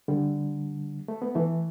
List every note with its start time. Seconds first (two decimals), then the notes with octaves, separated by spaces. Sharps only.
0.08 D3 G3
1.08 A3
1.22 B3
1.35 E3 A3